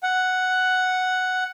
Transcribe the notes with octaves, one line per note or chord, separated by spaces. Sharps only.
F#5